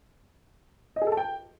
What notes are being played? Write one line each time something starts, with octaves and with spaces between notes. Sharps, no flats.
D#5
G#4
A4
A5
G5